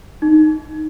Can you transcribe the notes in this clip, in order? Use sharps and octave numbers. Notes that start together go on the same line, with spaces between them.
D#4